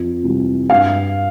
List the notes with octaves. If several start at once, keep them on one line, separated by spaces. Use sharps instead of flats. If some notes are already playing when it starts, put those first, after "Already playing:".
Already playing: F2
C3 E3 G3
G2 F5